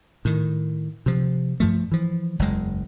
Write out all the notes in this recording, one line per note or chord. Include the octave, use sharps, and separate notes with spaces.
A2 D#3
C3 F3
G2 F3 A3
E3 F3
F#1 E2 G#3